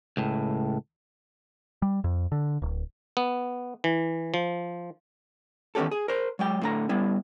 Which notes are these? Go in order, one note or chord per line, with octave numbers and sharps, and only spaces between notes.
C#2 A2
G3
F2
D3
D1
B3
E3
F3
D#3 E3 B3 C#4 G4 A4
G#4
A#4 C5
F#3 G#3 G5
A2 D3 A#5
G3 B3 E4